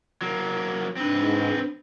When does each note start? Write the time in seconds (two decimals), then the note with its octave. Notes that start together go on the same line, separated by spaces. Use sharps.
0.21 F#3 A#3
0.97 G#2 C4 D4 B4